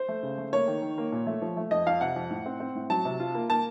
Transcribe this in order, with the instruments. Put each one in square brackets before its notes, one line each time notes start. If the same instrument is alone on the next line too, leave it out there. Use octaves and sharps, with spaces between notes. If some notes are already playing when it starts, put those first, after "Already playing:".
Already playing: [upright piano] C5
A3
C#3
A3
A#3 C#5
D#3
D#3
A#3
A#2
A3
F3
A3
F2 D#5
F2 F5
C3 F#5
F2
A2
C4
C4
A2
F#3 A5
C3
F4
A#3
A#3 A5